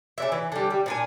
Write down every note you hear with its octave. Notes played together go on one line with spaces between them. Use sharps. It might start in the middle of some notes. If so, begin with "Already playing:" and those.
C#3 D4 E5
E3
D3 G3
G3
A#2 D4 G#5